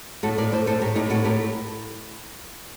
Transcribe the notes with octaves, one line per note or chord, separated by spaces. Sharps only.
A2 F#4 A4
A2 A#4 D5
A2 A4 C5
A2 A4 C5
A2 G4 A#4
A2 D#4 G4
A2 F#4 A4
A2 G4 A#4